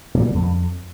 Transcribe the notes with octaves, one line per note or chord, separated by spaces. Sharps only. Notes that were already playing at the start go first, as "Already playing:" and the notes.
A#2
G3
D3
F2